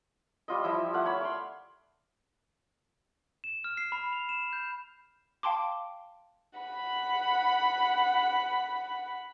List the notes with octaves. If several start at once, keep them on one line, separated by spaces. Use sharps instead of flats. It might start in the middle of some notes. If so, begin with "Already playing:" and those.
G3 F4 D#5
F3 G3 E4 E5
A3 F5 F#5
C#5 A5 B5
D5 C6
E7
F6
C7
B5
F7
E7
G6
F5 G5 A5 C6 D6
F#5 B5